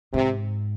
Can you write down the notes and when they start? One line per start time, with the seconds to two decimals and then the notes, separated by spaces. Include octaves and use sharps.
0.13 G#2 C3